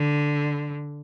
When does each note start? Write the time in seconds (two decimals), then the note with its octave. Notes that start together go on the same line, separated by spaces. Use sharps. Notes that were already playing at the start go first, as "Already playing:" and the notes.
Already playing: D3